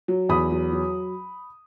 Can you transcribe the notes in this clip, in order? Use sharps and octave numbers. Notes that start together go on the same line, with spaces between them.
F#3
E2 B5 D#6
F#3
F#3